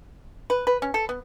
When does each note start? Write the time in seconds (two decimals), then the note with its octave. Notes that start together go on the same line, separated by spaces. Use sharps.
0.50 B4
0.67 B4
0.82 C#4
0.94 A4
1.09 B3